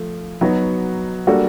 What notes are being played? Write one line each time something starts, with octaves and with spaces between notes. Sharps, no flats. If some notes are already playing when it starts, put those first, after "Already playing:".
Already playing: F3 A3
F#3 B3 D#4 F#4
G3 A#3 D4 F#4 A4